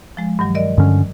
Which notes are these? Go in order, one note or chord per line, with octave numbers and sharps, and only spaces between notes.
F3 G#3
G2 D#3 F#3
A#4 D5 D#5
G2 D3 C#4